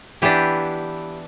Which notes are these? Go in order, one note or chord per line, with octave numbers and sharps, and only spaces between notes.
E3 B3 D4 E4 G4